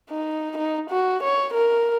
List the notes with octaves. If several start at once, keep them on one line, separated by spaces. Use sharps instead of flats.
D#4
D#4
F#4
C#5
A#4